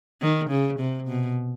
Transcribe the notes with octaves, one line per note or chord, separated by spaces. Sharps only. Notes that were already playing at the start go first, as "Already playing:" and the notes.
D#3
C#3
C3
B2